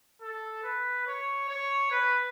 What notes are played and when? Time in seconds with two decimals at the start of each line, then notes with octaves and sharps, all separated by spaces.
0.22 A4
0.64 B4
1.07 C#5
1.49 C#5
1.91 B4